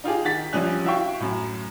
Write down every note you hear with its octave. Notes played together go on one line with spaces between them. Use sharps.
D#4 F4 G4 G#4
D#3 F#5 A6 B6
A#1 F3 G3 C#4 F#6
E4 F#4 E5 F5 G5 C#6
F#2 A2